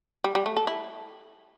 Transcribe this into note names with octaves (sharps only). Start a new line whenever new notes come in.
G3
G3
A3
A4
E4